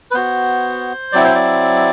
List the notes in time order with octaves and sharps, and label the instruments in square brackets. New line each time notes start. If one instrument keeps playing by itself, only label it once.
[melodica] B4
B3 F#4 C5
F#3 C4 E4 D5
C5
D5